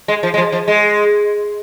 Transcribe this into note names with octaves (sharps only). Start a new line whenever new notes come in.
G#3
F3
G#3
F3
F3
G#3